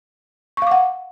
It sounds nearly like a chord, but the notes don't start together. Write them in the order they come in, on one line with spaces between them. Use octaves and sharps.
C#6 F5 D6 F#5